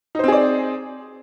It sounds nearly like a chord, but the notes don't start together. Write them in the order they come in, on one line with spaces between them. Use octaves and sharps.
D#4 C5 C4 G#4 D5